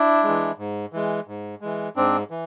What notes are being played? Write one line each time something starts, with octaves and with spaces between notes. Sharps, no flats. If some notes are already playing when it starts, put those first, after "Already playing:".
Already playing: D4 E4
E3 G#3
G#2
E3 G#3
G#2
E3 G#3
G#2 C4 D4
E3